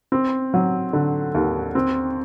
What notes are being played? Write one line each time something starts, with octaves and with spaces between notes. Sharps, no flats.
C4
F#3
D3
D#2
C4